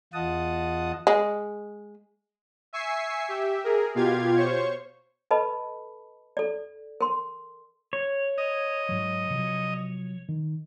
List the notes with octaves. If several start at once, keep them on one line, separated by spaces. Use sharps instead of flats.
E2 F4 D#5 F#5 A5 D#6
G#3
E5 G#5 C#6 E6 C7
G4 E5
G#4 A#4
B2 F4 G4 F5 G#6
C5 C#5 C#6
A4 B4 D#5 A5 B5
A4 D5
A#4 C6
C#5
D#5
G#2 F#3
C3 F3 F#3
D#3